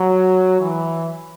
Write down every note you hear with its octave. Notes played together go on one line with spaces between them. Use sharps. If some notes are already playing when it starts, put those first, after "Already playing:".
Already playing: F#3
E3